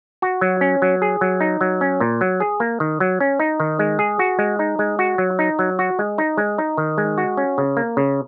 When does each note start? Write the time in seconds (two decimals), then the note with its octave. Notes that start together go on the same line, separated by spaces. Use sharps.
0.22 F#4
0.41 F#3
0.61 C#4
0.82 F#3
1.02 G#4
1.21 F#3
1.40 D#4
1.61 F#3
1.81 C#4
2.00 A#2
2.21 F#3
2.40 G#4
2.60 A#3
2.80 D#3
3.00 F#3
3.20 C#4
3.40 D#4
3.60 D#3
3.79 G#3
3.99 G#4
4.19 F#4
4.39 G#3
4.59 D#4
4.79 G#3
4.99 F#4
5.18 F#3
5.39 D#4
5.59 F#3
5.79 F#4
5.99 G#3
6.18 D#4
6.38 G#3
6.58 D#4
6.78 D#3
6.98 G#3
7.18 F#4
7.37 C#4
7.58 C#3
7.77 A#3
7.97 C#3